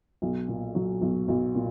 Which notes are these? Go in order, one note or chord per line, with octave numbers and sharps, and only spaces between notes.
B1
A#2
F#3
B1
B1
A#2